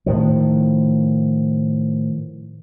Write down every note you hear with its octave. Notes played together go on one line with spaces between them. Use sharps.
A2 D#3 F3